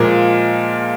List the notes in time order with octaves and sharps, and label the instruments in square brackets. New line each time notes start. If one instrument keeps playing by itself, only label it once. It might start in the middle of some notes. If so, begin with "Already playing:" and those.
Already playing: [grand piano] A#2 F3 G#3 A#4